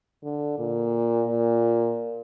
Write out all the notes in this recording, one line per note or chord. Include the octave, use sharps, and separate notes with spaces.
D3
A#2
A#2